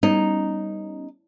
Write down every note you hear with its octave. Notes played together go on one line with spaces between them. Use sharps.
G3 B3 C#4 D#4